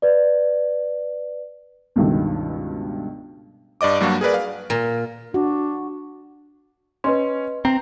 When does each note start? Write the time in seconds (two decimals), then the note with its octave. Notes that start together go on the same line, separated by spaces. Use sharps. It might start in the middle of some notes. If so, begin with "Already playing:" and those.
0.02 B4 D5
1.96 C#2 G2 B2 D#3 A3
3.81 G2 D5 D#5 D6
4.00 G2 F#3 G3 A#3 D4 F#4
4.21 G#4 A#4 B4 D5
4.34 F5
4.70 A#2
5.34 D4 F#4
7.04 C#4 B4 D#5 C6
7.65 C4 A#5